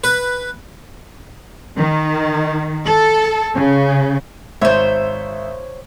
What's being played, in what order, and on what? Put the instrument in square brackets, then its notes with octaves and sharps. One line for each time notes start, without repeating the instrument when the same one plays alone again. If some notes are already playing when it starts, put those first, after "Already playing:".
[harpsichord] B4
[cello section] D#3
A4
C#3
[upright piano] G#1 E5 [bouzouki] C5 C#5